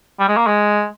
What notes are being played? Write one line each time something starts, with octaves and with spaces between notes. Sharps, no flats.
G3
G#3
A#3
G#3